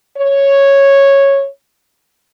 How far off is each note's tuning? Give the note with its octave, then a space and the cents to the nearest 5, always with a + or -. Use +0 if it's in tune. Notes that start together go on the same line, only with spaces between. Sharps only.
C#5 -5